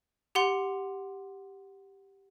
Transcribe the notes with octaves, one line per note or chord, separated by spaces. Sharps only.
G4 F#5 C6